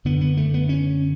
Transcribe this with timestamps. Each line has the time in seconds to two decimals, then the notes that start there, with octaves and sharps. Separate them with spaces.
0.05 F#2 D3 B3
0.21 B3
0.37 A3
0.54 B3
0.69 C#4